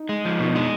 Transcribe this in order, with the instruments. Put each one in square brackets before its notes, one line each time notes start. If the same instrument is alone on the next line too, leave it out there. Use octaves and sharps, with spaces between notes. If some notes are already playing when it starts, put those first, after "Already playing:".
Already playing: [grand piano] D#4
[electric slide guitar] G#3
F3
[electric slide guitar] B2 [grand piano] D#4
[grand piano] D4
[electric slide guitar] G#3 [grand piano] D#4